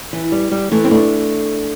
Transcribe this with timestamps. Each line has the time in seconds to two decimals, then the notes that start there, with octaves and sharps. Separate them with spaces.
0.13 E3
0.32 G3
0.51 G3
0.72 E3 A3
0.85 C4
0.91 A3 D4